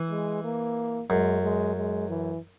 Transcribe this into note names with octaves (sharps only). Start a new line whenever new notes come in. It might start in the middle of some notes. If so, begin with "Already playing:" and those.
Already playing: E3
G#3
A#3
F#2 G#3
G#3
G#3
E3